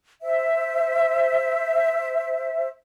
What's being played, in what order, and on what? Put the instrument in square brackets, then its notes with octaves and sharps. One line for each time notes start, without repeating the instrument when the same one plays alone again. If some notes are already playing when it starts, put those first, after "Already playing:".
[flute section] C5 E5